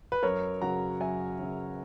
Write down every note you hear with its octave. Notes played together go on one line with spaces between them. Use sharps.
B4
F#2 A#4 C#5
C#3 F#3 F#5 A#5
F#2 E5 G#5
C#3 F#3